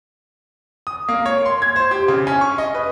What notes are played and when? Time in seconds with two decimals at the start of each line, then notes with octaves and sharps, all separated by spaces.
0.87 D#6
1.09 A#3
1.26 C#5
1.46 C6
1.62 G#6
1.76 C5
1.91 G4
2.08 C#3
2.27 C#4
2.41 C#6
2.58 D#5
2.74 B4